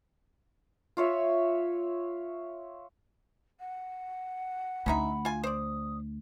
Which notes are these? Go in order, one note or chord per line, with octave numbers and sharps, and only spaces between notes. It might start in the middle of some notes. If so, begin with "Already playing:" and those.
F4 C#5 E5
F#5
D2 C#4 D#4 E5 B5
F4 G#5
C5 D5 D#6